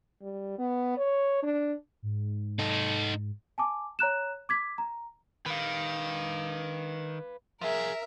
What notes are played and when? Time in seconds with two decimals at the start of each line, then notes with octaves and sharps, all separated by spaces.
0.21 G3
0.58 B3
0.97 C#5
1.43 D4
2.02 G#2
2.59 D#4 A4
3.58 G#5 A5 D6
3.99 C#5 A#5 F#6 E7
4.49 D6 G#6 B6
4.78 A#5
5.46 D#3 B4 F5
7.61 F3 G#4 A#4 E5